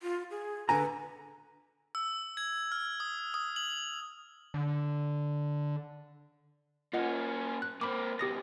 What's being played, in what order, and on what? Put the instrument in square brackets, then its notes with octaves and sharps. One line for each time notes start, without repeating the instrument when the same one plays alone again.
[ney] F4
G#4
[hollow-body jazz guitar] D3 G#5 A#5 [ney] B4
[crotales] E6
G#6
F6
D#6
D#6
F#7
[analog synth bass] D3
[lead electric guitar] A#3 C#4 [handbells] F4 D#5 F#5
[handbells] F#6
[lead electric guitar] A#3 C4 [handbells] B5 D6
[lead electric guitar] C#2 B2 [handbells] G4 D#6 A#6